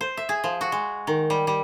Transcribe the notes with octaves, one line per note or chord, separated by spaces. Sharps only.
C5
E5
G#4
F3
F#4
G#3
D#3
G3
G3